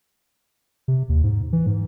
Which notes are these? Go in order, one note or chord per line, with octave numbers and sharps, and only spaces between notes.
C3
D#2
G#2
E3
G#2